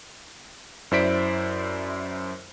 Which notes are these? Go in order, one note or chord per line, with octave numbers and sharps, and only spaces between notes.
F#2 E4 C5 D5 B6 D7